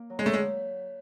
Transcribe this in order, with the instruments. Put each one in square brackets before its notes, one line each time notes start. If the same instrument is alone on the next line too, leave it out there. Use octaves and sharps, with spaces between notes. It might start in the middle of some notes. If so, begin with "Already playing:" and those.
Already playing: [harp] A#3
F#3
[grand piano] G#3
[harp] D3 [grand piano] A3
[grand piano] G#3